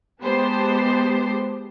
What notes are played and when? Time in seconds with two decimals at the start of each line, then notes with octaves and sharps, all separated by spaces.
0.22 G#3 B3 G4 C5 A5